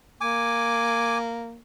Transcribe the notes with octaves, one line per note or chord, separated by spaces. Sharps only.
A#3 G#5 D6